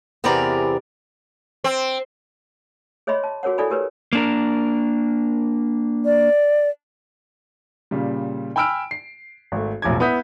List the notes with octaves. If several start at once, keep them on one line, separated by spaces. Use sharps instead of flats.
E2 C3 E3 A#4 D5 A#5
C4
G#4 C#5 D#5 E5 B5 C6
A5
F#4 G#4 A#4 C#5 F#5
E4 A4 D5 G#5 B5
G4 A#4 B4 C#5
A#3 D4 A#4
D5
A#2 C#3 G3
G5 G#5 B5 E6 F6 D7
C7
G#1 A3
E1 A1 F3 D6 G#6
B3 E4 D#6 G6 B6